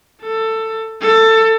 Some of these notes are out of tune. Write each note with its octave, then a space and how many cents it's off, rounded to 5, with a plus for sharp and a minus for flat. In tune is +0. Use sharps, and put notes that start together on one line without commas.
A4 +15
A4 +20